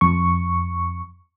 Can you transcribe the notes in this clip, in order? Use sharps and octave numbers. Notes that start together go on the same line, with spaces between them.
F2 C#6